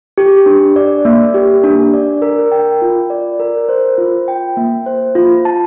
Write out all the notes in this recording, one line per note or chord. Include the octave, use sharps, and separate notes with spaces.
G4
D4
D5
A#3
G4
D4
D5
A#4
G5
F4
D5
A#4
C5
F4
G5
A#3
C5
F4
A5